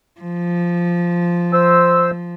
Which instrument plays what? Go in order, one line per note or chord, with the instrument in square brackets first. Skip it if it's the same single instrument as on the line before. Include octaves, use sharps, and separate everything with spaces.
[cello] F3
[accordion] C5 E6